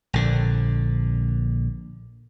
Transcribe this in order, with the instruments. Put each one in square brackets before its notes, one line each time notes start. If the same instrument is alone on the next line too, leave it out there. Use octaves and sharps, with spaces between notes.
[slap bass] A#1 D3